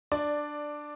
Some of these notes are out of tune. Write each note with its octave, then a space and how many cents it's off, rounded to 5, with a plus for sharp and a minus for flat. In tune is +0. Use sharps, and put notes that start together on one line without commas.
D4 +10 D5 +0